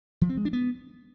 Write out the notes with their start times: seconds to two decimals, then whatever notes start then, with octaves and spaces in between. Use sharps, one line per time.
0.21 F3
0.29 C4
0.37 G#3
0.45 D4
0.53 B3